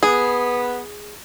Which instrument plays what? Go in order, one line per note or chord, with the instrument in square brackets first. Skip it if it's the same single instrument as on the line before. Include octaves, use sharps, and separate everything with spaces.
[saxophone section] B3 [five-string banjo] G#4